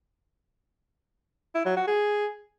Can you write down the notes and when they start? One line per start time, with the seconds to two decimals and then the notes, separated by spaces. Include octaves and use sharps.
1.55 E4
1.66 F#3
1.76 F#4
1.87 G#4